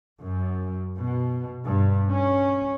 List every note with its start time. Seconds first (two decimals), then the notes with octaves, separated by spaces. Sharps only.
0.20 F#2
0.97 B2
1.64 G2
2.11 C#4